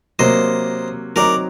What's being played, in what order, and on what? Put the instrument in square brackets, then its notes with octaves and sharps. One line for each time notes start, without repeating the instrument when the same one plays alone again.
[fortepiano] C3 F#3 A#3 [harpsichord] C5 D#5
[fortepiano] F#3 C4 D#4 [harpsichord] A#4 D5